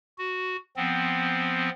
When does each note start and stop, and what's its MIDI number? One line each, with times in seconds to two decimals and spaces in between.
0.18 0.56 66
0.76 1.70 53
0.76 1.70 59
0.76 1.70 60